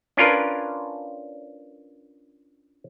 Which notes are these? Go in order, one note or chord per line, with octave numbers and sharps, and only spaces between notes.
C#4 D4 F4 A#4 B4